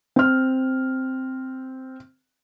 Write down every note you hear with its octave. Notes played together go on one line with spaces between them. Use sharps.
C4 F6